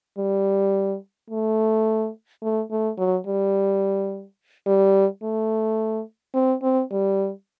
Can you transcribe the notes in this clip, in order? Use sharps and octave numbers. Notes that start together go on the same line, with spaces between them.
G3
A3
A3
A3
F#3
G3
G3
A3
C4
C4
G3